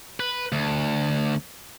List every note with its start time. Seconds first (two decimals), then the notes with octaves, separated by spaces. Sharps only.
0.20 B4
0.52 D2